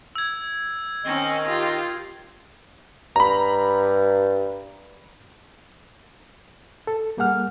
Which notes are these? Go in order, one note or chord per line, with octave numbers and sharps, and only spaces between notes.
E6 G#6
D#3 C4 C#4 D#5
F4 G4
G2 A#5 B5
A4
G3 A#3 G#4 F#5 F6